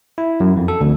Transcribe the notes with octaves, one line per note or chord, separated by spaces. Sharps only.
E4
F#2
F2
A4
D2